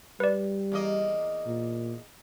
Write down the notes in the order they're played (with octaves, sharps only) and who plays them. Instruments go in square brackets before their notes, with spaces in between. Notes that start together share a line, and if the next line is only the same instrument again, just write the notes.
[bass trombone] G3 [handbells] B4 D5
[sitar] E2 A#3 D#5
[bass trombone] A#2